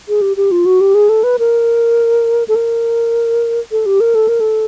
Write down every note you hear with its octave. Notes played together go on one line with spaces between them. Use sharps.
G#4
G4
G4
F4
F#4
G4
G#4
A4
B4
A#4
A4
A#4
A4
G4
A#4
A4
A#4
A4